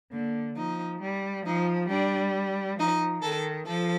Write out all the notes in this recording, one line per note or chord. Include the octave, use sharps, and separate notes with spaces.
D3 A#3
F3 D#4
G3
F3 D#4
G3 D4
F3 D#4
D#3 A4
F3 A4